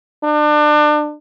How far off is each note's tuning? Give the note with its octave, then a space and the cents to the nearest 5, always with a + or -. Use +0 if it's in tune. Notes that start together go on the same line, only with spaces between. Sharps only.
D4 +30